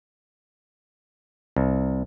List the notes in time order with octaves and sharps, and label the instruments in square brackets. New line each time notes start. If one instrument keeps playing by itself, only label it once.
[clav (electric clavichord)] C2